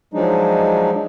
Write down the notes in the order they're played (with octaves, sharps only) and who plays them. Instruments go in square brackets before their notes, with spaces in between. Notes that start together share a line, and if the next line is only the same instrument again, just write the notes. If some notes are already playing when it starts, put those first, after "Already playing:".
[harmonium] F3 F#3 G#3 D4 D#4